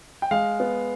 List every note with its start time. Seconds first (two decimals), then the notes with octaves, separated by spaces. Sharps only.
0.22 G5
0.31 G#3 F5
0.60 B3